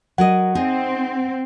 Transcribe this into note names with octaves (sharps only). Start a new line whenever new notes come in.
F#3 A#4 D#5 F#5
C4 D#4 G#4